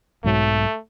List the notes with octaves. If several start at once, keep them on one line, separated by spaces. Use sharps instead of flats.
B1 G#2 F#3 A3